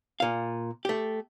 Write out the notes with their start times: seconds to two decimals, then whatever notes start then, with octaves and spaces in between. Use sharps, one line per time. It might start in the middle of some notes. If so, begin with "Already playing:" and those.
0.20 A#2 F5
0.85 A3 G4